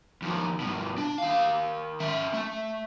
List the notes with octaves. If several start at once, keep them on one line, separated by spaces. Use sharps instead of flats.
F2 D#3
G2 B2
D4
D#3 F5
C#4 E5
A3